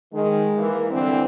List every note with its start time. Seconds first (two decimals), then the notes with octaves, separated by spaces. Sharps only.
0.14 D#3 G#3
0.56 E3 A#3
0.91 G2 D3 E3 C4